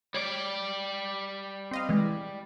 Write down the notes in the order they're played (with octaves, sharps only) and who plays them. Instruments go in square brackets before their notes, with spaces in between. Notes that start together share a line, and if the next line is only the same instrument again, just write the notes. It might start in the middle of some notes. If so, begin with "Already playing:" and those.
[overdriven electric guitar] G3 D5 [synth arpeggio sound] C#5
[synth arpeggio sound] C4 D#5 F5
E3 G#3